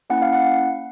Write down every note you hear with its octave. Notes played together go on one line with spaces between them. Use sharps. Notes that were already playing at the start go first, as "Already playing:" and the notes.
A#3 C#4 E4 F#5
F5
F#5